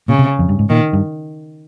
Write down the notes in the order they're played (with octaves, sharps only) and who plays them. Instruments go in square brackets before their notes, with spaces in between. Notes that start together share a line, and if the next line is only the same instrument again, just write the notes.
[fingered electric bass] A#2 [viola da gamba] C#3
[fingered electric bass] C3
F2
G2
G#2
[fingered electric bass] A#2 [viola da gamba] D#3
[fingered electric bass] G2